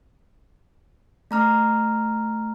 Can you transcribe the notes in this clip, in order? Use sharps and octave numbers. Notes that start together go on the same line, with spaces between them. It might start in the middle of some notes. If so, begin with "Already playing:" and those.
A3 A#5 F6